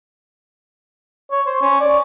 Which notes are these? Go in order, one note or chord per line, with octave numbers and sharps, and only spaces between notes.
C#5
C5
C#4
D5